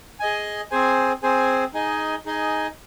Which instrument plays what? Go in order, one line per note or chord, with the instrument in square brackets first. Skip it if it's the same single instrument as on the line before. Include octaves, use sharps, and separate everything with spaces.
[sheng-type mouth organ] G#4 D#5 G#5
C4 G#4 C5 G#5
C4 G#4 C5 G#5
D#4 G#4 D#5 G#5
D#4 G#4 D#5 G#5